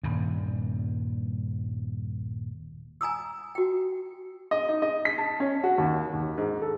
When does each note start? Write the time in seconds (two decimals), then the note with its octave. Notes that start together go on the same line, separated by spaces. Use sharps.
0.03 D#1 G2
3.01 G#5 A#5 D#6 E6
3.55 F#4 G5
4.51 D#5
4.69 D#4
4.82 D#5
5.05 B6
5.18 A5
5.40 C#4
5.64 F#4
5.78 D#2
6.13 D#2
6.38 G#2
6.62 A4